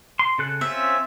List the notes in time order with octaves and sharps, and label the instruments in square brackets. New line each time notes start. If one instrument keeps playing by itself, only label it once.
[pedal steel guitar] C6
C#3 A4 F#6
[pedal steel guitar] C4 C#4 F4 [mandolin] E5